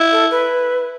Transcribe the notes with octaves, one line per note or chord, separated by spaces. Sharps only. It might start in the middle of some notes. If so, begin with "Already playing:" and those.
Already playing: E4
A4
B4